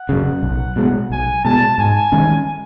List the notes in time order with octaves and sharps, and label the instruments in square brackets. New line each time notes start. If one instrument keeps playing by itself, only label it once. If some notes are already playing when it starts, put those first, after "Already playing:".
Already playing: [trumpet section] F#5
[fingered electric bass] F#2 C#3
B1
B2 G#3
[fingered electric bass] B1 [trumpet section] G#5
[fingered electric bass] B2 G#3 [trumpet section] A5
[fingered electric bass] G#2 [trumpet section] G#5
[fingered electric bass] D#3 G#3 C#4